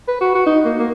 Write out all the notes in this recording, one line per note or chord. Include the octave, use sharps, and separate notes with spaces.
B4
F#4
F#4
D#4
A#3
A#3